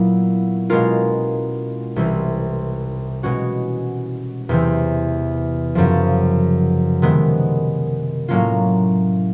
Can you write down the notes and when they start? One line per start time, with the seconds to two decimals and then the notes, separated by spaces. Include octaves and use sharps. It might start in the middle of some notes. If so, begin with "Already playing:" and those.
Already playing: A#2 F#3 B3 E4
0.70 B2 G#3 C#4 F4 A#4
1.96 C2 C3 E3
3.23 B2 G#3 C#4 F#4
4.49 E2 C3 E3
5.75 F#2 C#3 F3
7.02 C3 D#3 G#3 B3
8.28 A2 F#3 A#3 C#4 F4